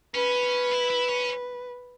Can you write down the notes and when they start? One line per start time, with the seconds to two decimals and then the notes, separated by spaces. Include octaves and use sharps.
0.14 C#4 B4
0.71 E4
0.90 E4
1.08 C#4